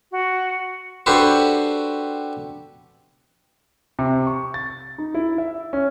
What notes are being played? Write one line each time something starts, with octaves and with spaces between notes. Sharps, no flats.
F#4
D4 F#4 G4 A4 B4 C5
C3
C#6
A6
D#4
E4
E5
C#4